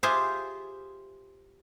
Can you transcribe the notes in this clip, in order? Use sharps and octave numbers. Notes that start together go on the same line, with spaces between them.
F4 G4 G#4 C5 E5